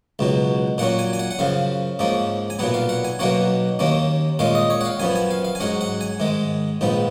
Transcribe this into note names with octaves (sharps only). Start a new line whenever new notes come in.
C#2 B2 F#3
A#2 F#3 C#4 F#5
G#5
G#5
F#5
F#5
F#2 C#3 F3 F5
G#2 F3 A#3 C#4
G#5
B1 A#2 F#3 B3 F#5
F5
F#5
G#5
B1 B2 F#3 A#3 C#4 F#5
D#2 D#3 A#3 C#4
A#2 G#3 C#4 F5
D#5
C#5
F#5
F5
F#2 F3 B3 G#5
G#5
F5
F5
G#5
G#2 F#3 C#4 F#5
F#5
G#5
G#2 D#3 G#3
A#1 G#2 F3 B3